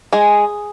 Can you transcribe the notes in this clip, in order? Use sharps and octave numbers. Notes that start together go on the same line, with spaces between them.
G#3 G#4